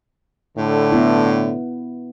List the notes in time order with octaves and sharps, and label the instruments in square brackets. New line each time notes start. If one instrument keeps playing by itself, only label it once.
[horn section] A2 D3
[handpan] B3 E4